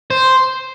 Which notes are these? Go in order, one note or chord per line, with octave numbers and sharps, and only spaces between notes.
C5